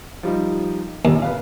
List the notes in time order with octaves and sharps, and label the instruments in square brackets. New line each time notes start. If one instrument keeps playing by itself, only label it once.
[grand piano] F3 G3 D#4
[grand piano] F1 A#1 [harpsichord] D#2
[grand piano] B4 F5